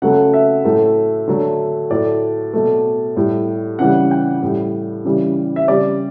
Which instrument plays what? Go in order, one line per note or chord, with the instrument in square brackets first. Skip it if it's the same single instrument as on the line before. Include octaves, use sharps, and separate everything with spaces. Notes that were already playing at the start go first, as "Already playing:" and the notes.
[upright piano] C#3 F#3 A3 F#5
E5
A2 F#3 A3
D3 F#3 A3
A2 F#3 A3 D5
B2 F#3 A3
A2 G3
C#3 E3 G3 F#5
G5
A2 G3
C#3 E3 G3
E5
C#3 G3 D5